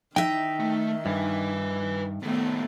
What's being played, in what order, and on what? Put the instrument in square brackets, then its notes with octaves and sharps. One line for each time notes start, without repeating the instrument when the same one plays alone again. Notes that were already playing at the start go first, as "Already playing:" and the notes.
[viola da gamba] D#3 [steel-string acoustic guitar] D#4 E5 [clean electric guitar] G5
[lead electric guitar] A3
[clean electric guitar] G2 [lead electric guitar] B4 G#5
[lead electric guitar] A2 D#3 [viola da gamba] A3 B3